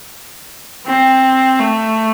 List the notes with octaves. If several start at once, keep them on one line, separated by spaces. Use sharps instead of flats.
C4
A3